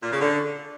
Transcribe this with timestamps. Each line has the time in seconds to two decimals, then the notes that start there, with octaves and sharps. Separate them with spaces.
0.03 A#2
0.12 C#3
0.21 D3